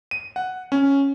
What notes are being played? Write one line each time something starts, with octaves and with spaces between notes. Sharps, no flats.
D#7
F#5
C#4